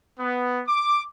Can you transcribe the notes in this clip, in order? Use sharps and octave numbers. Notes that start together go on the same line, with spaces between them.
B3
D6